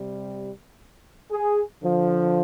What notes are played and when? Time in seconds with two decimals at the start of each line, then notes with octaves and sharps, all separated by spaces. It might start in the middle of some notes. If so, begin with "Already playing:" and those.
Already playing: C3 G3
1.30 G#4
1.81 D3 F3